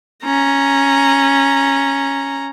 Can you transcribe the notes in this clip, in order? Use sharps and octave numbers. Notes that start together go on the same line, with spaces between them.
C#4 A#5